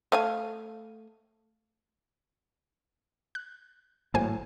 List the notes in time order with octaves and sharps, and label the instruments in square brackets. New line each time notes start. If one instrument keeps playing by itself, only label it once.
[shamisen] A3 F5 G#5
[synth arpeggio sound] F#6
[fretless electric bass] G#1 A2 F#3 [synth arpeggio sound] A#3 C5 G#5